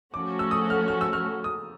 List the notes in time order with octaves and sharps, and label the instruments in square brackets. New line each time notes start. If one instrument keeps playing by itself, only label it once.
[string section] F3 A3 C#4 F#4 A4 [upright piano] D6
[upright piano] E6
D#6
F6
F6
E6
F6
D#6